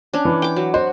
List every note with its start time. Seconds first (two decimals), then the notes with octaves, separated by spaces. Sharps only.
0.13 C#4 D4
0.25 E3
0.42 G5 D6
0.56 F#3
0.74 F#4 C5